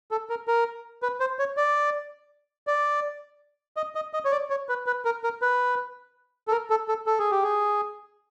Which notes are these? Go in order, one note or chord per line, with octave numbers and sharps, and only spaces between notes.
A4
A#4
A#4
B4
C5
C#5
D5
D5
D#5
D#5
D#5
C#5
D5
C#5
B4
B4
A#4
A#4
B4
A4
A#4
A4
A4
A4
G#4
G4
G#4